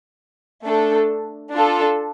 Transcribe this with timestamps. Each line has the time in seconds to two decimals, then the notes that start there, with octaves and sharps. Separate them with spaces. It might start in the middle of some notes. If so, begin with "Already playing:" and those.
0.63 A3 D4 A4
1.52 D4 F4 A4